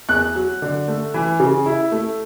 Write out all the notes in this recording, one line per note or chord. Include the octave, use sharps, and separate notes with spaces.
E2 F#6
F#3
D3
A3
E3
C#3
E4
A3